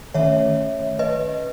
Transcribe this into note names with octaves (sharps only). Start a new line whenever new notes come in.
D#3 A3 C#4 C#5 E5
B4 D#5